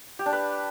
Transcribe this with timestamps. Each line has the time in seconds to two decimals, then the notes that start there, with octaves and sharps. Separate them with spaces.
0.19 G4
0.26 D4
0.33 B4